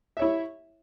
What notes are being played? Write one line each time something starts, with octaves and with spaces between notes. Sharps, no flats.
E4 C#5 E5